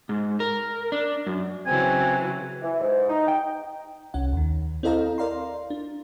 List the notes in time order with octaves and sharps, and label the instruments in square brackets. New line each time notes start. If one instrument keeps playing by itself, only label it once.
[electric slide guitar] G#2
A#4
D4
F#2
[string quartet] C#3 E3 F#3 [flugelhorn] C4 [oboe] G#5
[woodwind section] E3
G#2
D#4
G5
[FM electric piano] C2 C#4 F#5
D#2 D#3
C4 E4 A4 D#5 F5 A#5
A#4 D5 F5 A#5 C6
D4